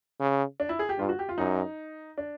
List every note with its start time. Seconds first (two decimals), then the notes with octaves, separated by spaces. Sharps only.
0.20 C#3
0.60 D4
0.69 E4
0.79 G#4
0.89 G4
0.99 G2 F4
1.09 F#4
1.19 G4
1.29 F4
1.38 F#2 D#4
2.18 D4